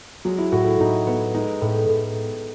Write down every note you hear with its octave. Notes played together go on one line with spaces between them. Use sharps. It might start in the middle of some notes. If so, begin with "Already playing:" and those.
F#3 G#3
E4
A2 F#4
E4
A2 D#4
B3
G#3 D#4
A2
A2